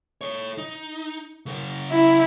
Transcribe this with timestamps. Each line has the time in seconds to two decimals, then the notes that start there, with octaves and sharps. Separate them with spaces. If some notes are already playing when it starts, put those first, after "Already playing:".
0.21 A4 C#5
0.58 D#4
1.46 C#3 A#4
1.91 E4